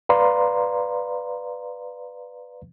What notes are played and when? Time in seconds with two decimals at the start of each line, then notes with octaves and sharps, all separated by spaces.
0.09 B4 D5 F5 A#5 C6